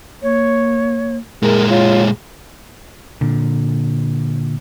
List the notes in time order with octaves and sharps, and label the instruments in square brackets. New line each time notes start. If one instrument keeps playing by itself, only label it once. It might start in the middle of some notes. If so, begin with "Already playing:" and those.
[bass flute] A#3 [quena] C#5
[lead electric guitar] A#2 G#3 [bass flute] G#4 [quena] A#4
[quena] F4 [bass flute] C#5
[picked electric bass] A#2 D3